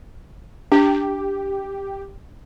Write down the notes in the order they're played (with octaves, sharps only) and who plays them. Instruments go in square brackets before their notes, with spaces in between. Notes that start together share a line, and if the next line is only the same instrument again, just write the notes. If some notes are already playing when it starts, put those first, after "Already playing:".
[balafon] D4 [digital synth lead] G4